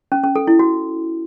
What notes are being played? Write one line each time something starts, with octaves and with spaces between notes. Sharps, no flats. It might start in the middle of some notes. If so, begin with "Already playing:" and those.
C#4
C#4
A4
E4
F#4